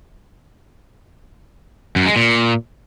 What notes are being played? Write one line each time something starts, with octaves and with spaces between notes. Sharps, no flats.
F#2
G#3
A#2